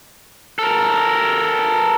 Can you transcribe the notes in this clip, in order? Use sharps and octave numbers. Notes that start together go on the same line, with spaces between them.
A4 A#4